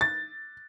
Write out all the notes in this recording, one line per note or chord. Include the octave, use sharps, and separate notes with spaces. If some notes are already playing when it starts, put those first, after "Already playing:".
A6